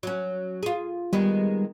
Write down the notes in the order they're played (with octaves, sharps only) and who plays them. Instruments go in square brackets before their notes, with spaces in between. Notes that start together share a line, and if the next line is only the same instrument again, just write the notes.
[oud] F#3 C#4
F4 G#4
[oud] D#3 G#3 B3 [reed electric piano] G3